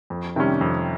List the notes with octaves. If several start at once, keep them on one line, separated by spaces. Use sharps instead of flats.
F2
C3 D#3 G3 C#4
F2